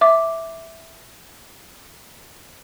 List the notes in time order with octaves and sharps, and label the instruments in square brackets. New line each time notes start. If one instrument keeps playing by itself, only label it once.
[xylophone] E5 D6